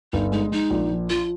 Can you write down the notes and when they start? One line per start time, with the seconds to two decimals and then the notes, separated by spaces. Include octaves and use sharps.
0.13 G1 D#4
0.32 G#3 D#4
0.52 G#3 D#4
0.70 A#1
0.90 F3
1.10 F3 F4